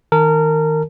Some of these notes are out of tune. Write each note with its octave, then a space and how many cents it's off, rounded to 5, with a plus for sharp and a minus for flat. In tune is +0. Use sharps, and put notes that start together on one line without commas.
D#3 +15 A#4 -25 A5 -30